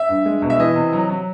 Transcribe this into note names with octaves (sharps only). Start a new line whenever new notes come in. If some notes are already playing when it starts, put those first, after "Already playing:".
Already playing: E5
G2
G#3
B2
E5
E3 D#5
C3
F#3
F#3